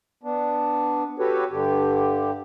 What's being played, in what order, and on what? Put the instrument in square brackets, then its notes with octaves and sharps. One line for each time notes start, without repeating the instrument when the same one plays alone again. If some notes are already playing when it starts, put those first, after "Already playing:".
[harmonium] B3 D4
F#4 G4 A4 B4 C#5
G2 D3 G4